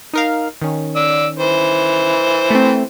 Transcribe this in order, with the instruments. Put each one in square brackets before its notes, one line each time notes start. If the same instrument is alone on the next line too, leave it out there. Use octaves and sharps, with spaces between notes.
[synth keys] D#4 A#4 F5
D#3 C#4
[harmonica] D5 E6
E3 C5
[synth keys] A3 C4